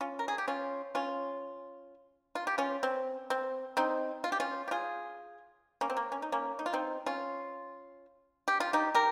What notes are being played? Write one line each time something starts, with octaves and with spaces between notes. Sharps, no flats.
C#4 F4
A#4
G#4
G4
C#4 F4
C#4 F4
F4
G4
C#4 F4
C4
C4
C4 D#4
F4
G4
C#4 F4
G4
F4 G#4
A#3 C#4
C4
A#3
C#4
D#4
A#3 C#4
D#4
F4
C4 D#4
C#4 F4
G4
F4
D#4 G4
G4 A#4